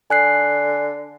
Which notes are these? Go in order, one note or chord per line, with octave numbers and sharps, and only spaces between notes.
D3 G#5 F#6 C7